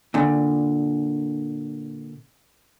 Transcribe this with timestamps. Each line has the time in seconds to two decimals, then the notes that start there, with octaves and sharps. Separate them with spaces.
0.14 A#2 D3